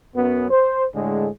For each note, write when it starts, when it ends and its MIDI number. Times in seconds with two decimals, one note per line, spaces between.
0.15 0.50 42
0.15 0.50 59
0.50 0.84 72
0.94 1.27 45
0.94 1.27 50
0.94 1.27 56